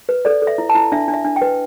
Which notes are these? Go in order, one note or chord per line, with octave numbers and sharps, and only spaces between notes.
B4
A4 D5
A4
E5
E4
A5
E4
D4 E5
D4
E5
D4
G5
B4